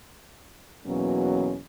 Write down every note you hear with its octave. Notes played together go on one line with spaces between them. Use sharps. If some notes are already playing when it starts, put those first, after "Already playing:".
E2 B2 F#3 A#3 C#4